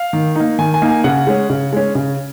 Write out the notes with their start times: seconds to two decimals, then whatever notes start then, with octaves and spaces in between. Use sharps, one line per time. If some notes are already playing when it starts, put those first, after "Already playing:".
Already playing: F5
0.13 D#3
0.36 A#3 D#4
0.59 D#3 G#5
0.74 G#5
0.82 A#3 D#4
0.89 G#5
1.04 C#3 F#5
1.27 G#3 C#4
1.50 C#3
1.73 G#3 C#4
1.95 C#3